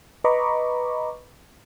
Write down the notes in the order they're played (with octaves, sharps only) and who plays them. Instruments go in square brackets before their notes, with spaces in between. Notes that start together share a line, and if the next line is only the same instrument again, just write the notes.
[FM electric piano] B4 D#5 A#5 B5 C#6 D6